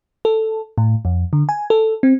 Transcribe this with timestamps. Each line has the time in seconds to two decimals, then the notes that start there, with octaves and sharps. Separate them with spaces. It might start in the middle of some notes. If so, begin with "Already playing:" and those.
0.25 A4
0.78 A2
1.05 F2
1.33 D3
1.49 G#5
1.70 A4
2.03 C4